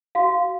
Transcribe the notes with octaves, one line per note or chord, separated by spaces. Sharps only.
F#4 F5